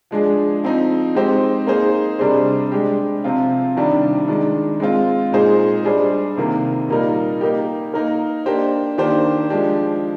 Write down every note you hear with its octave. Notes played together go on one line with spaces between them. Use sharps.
F3 G#3 D4 G#4
F3 C4 D#4
G#3 C4 D#4 G4 C5
A#3 D#4 G#4 C5
C3 G3 D4 G#4 C5
G#3 D4 G4
C3 F3 C4 F4
C3 D#3 G3 D4 G4
D#3 G#3 D4
G#3 C4 F4
A#2 G#3 D#4 G#4 C5
G3 D4 G#4 C5
C3 D#3 A#3
A#2 G3 A#3 D#4 A#4
A#3 D#4 G4
A#3 D#4 A#4
A#3 D4 G4 C5
D#3 A#3 D4 G4 C5
F3 G#3 D4 G4